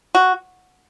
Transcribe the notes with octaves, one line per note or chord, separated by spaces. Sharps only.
F#4